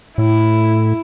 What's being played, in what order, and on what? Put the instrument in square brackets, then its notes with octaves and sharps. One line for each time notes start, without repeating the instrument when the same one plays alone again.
[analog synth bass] A2 [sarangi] E4